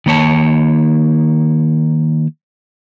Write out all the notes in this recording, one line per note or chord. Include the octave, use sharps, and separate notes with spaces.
D#3 A#3 C#5 A5